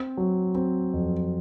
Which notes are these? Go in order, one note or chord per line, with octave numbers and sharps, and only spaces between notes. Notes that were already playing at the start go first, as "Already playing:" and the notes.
Already playing: C4
F#3
C4
F2